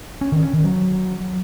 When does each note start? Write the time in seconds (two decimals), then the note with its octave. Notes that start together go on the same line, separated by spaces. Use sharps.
0.21 C#4
0.32 D#3
0.43 C#4
0.53 D#3
0.64 F#3